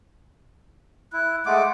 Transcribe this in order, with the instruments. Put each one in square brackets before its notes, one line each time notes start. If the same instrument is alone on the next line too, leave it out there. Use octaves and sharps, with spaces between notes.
[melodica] E4 [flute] F#6
[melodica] G#3 A3 D6 [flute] F#5